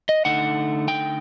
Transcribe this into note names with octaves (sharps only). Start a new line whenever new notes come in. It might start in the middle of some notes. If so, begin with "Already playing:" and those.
D#5
D3 A3 D#4 F#5
G5